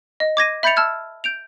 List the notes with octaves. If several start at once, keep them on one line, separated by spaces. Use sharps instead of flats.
D#5
D6 G#6 A#6 D#7
E5 B5 G6 A6 C#7 F7
A5 E6 F6 G#6
G6 D7 F7